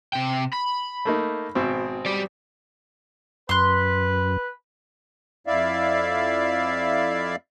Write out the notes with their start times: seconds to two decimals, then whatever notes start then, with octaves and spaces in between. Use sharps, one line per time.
0.13 C3 G5
0.53 B5
1.05 A3 A#3 D#4
1.55 G#1 B2 C4
2.06 G3 D5
3.49 F#2 B4 C6 F#6
5.47 F2 E4 D5 E5 F5